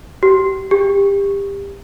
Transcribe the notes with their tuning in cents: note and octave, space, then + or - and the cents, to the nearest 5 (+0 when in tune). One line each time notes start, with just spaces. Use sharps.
G4 -35
G4 +25